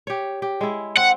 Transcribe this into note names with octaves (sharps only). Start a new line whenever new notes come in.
G4 C#5
G4
G#3 E4
C4 F#5